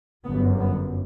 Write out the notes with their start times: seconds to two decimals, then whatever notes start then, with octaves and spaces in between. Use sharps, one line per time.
0.24 G1 F#2 B3
0.59 B3